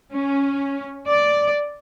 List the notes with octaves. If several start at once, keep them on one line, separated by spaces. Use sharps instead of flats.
C#4
D5